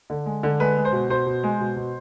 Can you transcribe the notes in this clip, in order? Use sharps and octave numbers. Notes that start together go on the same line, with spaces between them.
D3
G#3
D3
G#3 B4
G#3
C5
B2
B2 C5
B2
G#3
B2
B2